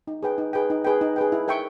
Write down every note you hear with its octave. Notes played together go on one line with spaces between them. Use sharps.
D#4
G#4 B4 G5
D#4
G#4 B4 G5
D#4
G#4 B4 G5
D#4
G#4 B4 G5
E4
A#4 E5 G5 C#6